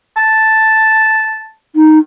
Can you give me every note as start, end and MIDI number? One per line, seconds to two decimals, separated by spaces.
0.17 1.51 81
1.76 1.98 63